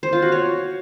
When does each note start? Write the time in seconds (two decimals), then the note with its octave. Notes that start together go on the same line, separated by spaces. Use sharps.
0.03 C5
0.13 F4
0.22 F#4
0.32 C#5